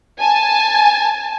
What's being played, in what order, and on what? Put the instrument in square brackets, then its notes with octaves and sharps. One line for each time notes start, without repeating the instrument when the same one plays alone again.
[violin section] G#5 A5